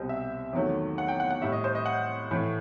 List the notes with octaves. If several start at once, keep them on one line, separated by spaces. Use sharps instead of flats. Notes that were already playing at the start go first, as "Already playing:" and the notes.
Already playing: C2 B2 G3 C5 D#5
E5
E2 D#3 F#3 A3
F#5
G5
F#5
F#5
A2 G3 E5
D#5
C5
D#5
F#5
A2 E3 A3